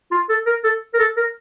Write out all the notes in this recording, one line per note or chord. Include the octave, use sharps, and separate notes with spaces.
F4
A4
A#4
A4
A#4
A4
A#4